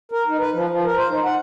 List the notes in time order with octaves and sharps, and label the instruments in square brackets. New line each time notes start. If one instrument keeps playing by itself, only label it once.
[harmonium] A#4
D#4
B4
F3
F3
A#4
C5
D#4
F#5